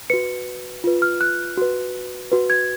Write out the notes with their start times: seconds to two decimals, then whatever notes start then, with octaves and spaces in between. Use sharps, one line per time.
0.10 F#4 B4 C#7
0.84 F4 B4
1.02 F6
1.21 F#6
1.57 F#4 B4
2.31 F#4 B4
2.50 G#6